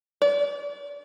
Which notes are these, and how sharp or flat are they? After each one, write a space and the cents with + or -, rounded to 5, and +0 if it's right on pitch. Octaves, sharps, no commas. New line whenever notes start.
D5 -35